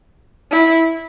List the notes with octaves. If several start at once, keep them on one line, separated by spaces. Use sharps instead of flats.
E4